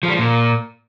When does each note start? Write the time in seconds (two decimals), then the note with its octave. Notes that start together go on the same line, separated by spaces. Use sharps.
0.03 F3
0.08 G3
0.14 F3
0.19 A#2